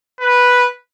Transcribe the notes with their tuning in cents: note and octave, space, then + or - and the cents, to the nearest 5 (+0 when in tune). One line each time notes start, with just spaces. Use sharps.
B4 -5